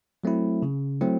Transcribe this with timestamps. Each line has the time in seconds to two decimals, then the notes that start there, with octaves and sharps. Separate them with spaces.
0.24 F#3 A3 C4 E4
0.62 C#3
1.01 F#3 A3 C4 E4